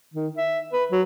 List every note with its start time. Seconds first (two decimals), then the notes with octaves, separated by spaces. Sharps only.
0.14 D#3
0.37 E5
0.73 B4
0.92 F#3